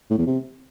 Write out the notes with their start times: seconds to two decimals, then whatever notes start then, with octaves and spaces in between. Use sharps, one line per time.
0.10 A2
0.18 E2
0.27 C3